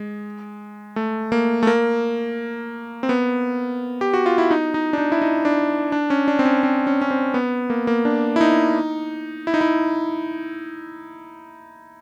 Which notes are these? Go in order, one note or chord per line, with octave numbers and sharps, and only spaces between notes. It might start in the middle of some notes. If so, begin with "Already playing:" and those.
Already playing: G#3
A3
A#3
A3
A#3
C4
B3
G4
F#4
F4
E4
D#4
D#4
D4
D#4
E4
D#4
D4
D4
C#4
D4
C4
C#4
C4
C#4
C#4
C4
B3
A#3
A#3
D4
E4
D#4
E4
D#4
E4